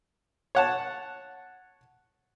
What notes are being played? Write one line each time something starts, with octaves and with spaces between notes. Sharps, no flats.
C#5 F#5 A5